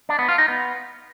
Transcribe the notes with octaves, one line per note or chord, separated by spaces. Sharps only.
D4
B3
F4
D#4
B3